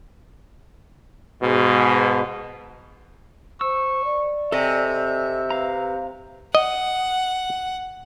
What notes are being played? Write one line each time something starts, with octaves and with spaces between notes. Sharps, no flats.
G#2 B2
C5 C#6 E6
D5
C3 A4 D#5 E5 G#5
B4 F5 A#5
D#5 F#5